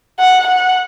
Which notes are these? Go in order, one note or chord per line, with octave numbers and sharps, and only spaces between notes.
F#5
F#5